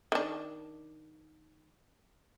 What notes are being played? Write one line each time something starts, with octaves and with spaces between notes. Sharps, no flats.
D#3 D4